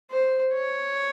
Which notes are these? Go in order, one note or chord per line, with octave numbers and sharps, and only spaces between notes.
C5
C#5